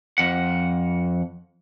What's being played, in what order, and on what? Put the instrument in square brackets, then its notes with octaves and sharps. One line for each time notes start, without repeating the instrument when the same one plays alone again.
[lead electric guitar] F2 F#5